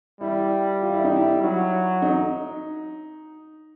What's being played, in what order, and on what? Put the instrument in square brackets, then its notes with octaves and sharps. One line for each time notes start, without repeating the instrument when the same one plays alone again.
[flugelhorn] G3 [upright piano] E4
[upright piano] F4
E4
D#4
E4
[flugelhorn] F#3
[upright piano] D#4